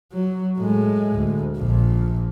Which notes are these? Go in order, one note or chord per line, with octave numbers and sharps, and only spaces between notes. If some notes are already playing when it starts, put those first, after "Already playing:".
F#3
A2 G#3
D2
A#1 A#2